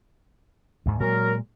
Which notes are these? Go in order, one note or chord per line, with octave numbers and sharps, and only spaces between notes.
D2 G#2
A#2 F#3 G#3 A#4